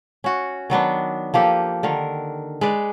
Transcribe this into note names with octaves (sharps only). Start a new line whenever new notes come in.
C#4 F#4
D#3 F#3 B3 D4
F3 A#3 G4 A4
D3 D#3 A#4
G#3 B4 D5